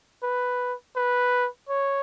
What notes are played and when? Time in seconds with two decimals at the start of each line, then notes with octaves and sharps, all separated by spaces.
0.23 B4
0.96 B4
1.69 C#5